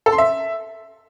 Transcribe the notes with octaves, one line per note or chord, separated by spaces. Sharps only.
A4
C6
E5